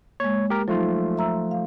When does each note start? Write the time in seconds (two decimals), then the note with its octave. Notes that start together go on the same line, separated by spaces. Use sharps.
0.20 G#3 A#3 C#5
0.50 G4 A#4
0.68 F3 F#3 A3 D#4 F4
1.17 E5 A#5 E6
1.51 F5